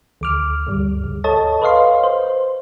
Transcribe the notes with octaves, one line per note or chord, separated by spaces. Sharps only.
D2 D6 F6
D2 G2 G3
C#2
A4 C#5 D#5 A5
B4 C#5 D#5 F5 C6
C5